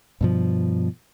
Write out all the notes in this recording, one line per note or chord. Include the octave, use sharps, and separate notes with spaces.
G2 B2 F3